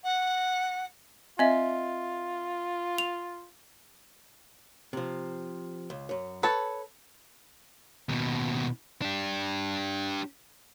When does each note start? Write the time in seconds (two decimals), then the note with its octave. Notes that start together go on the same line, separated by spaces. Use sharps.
0.04 F#5
1.39 C4 F4 D#5 E5
2.98 F7
4.93 C3 F3
5.90 C#2
6.09 F#2 C#5
6.43 A4 B4 C#5 A5
8.09 D#2 B2
9.02 D4 G4